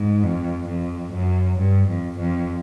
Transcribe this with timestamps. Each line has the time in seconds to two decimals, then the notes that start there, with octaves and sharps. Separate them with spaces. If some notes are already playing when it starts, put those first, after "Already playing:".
Already playing: G#2
0.23 F2
0.68 F2
1.12 F#2
1.58 G2
1.88 F2
2.18 F2